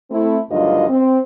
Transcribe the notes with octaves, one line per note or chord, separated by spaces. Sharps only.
A3 C4 E4
D2 G2 D#3 F#3 F4 D#5
C4